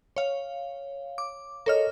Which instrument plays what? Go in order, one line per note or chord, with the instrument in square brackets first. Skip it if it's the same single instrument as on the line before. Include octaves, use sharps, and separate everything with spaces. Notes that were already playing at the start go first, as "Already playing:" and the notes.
[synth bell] C#5 F5
D6
[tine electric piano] A4 D#5 [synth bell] A#4 C#5 F6